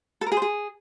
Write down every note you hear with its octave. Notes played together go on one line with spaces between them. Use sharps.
A4
A#4
G#4
C5
G#4